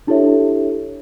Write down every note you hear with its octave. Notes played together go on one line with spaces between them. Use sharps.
D4 E4 G4 A4 C#5 E5